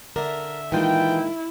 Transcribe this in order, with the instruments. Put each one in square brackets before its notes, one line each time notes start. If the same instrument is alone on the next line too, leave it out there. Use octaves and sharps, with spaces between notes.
[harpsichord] D3 D4 [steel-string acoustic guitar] A#4 [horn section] E5
[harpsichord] A#2 D#3 G#3 [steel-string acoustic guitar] E3 F4 G#4 [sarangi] E4 [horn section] G5